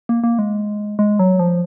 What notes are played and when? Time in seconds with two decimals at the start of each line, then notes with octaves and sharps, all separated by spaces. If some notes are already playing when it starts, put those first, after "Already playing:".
0.09 A#3
0.24 A#3
0.39 G#3
0.99 G#3
1.19 F#3
1.39 F3